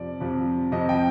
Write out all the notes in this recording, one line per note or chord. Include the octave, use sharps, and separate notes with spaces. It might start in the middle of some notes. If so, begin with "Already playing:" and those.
Already playing: F2 C3 F3 D5
F2 C3 F3
F2 C3 F3 D#5
G5